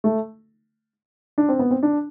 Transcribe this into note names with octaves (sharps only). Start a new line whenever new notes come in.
A3
D4
C4
B3
C4
D4